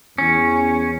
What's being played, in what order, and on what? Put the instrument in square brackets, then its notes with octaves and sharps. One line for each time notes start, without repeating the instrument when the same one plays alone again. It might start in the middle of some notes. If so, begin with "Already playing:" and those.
[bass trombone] E2 [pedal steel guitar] C#4